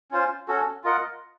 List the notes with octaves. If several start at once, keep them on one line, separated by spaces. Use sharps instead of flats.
C#4 F4 C5
C#4 F#4 A4
F4 A#4 D#5 F#5